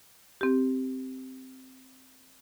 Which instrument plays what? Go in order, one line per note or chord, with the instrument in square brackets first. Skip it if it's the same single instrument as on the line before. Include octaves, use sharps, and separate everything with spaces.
[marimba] C4 G4